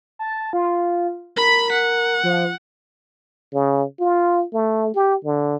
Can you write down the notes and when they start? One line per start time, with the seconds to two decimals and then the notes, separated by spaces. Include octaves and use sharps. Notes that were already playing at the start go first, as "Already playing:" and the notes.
0.19 A5
0.53 F4
1.37 A#4 B5 B6
1.72 F#5
2.24 F3
3.54 C#3
4.00 F4
4.53 A3
4.95 G4
5.24 D3